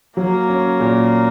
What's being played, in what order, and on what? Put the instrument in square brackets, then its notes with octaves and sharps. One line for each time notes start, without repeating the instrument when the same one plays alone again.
[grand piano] F#3 [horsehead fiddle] A#3
[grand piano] C#4
A#2